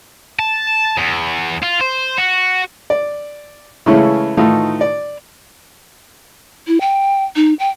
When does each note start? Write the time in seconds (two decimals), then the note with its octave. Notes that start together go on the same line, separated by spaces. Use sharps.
0.39 A5
0.98 E2
1.63 F4
1.81 C5
2.19 F#4
2.90 D5
3.86 C#3 E3 G#3 A3 C#4 E4
4.37 A2 D#3 E3 A3 D#4 F4
4.81 D5
6.68 E4
6.81 G5
7.36 D#4
7.59 G5